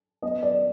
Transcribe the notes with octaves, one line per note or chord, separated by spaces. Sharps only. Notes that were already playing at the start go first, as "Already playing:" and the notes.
B3 D#5
D5